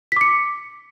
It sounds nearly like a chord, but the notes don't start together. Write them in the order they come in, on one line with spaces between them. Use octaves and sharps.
B6 D6 C#7